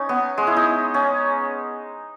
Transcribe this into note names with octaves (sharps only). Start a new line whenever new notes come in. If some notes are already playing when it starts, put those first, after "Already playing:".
Already playing: C#4 D#4
B3
G#3
E4
D#4
C#4